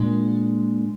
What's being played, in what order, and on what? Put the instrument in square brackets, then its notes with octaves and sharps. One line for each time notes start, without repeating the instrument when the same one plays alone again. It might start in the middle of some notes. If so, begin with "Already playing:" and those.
Already playing: [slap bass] A#2 G#3 D4